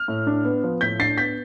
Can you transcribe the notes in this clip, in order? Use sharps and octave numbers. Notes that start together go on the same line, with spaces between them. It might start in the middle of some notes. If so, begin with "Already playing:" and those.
Already playing: F6
A2
D4
B3
F3
A2 G6 B6
D4 A6 C7
B3 G6 B6